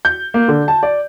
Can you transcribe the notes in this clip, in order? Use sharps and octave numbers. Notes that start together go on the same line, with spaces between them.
G6
A#3
D3
A5
D5